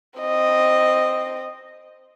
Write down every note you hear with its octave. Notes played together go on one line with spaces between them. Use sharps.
C4 D#5